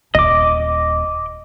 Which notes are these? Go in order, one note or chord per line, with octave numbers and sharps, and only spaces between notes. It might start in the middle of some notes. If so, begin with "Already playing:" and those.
D#1 D#5 D6